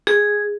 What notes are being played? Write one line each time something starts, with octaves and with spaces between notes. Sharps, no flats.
G#4